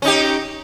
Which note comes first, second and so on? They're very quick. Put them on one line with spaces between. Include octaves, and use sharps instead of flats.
C#4 D#4 G4